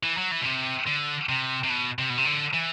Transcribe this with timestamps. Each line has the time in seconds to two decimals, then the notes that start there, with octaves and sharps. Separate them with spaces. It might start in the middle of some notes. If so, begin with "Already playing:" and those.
0.03 E3
0.17 F#3
0.31 E3
0.41 B2
0.45 C3
0.86 D3
1.29 C3
1.64 C3
1.70 B2
1.99 C3
2.10 B2
2.18 C3
2.26 D3
2.54 E3